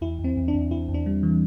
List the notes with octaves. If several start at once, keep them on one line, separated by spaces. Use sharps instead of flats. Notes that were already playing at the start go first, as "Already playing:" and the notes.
E2 E4
E2
C4
E2
D4
E2
E2 E4
E2
D4
G3
E3